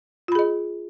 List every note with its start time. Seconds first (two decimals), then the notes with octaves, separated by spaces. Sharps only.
0.28 F4
0.32 B5
0.35 G#4
0.39 D#5